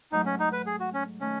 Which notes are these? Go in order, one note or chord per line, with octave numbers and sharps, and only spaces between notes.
G#2 F#3 A3 D#4
C#4
D#4
B4
G#4
F#4
C#4
D#3 A3 C#4